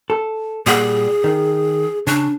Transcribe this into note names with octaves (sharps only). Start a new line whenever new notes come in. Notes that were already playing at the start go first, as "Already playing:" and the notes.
A4
A#2 G3 G#4 F#5
D#3
C#3 D4